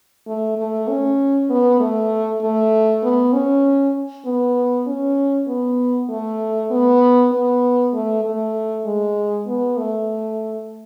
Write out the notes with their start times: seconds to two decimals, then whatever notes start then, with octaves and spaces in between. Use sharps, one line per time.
0.27 A3
0.58 A3
0.88 C#4
1.50 B3
1.80 A3
2.42 A3
3.03 B3
3.33 C#4
4.26 B3
4.87 C#4
5.48 B3
6.09 A3
6.71 B3
7.32 B3
7.94 A3
8.24 A3
8.85 G#3
9.47 B3
9.78 A3